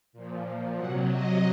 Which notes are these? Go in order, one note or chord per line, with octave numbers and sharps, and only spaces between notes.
A#2 F3
C3 F#3 F#5
D#5